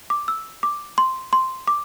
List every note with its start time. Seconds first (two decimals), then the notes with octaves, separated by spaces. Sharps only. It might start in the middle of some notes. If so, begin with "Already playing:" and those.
0.10 D6
0.28 E6
0.63 D6
0.98 C6
1.33 C6
1.67 D6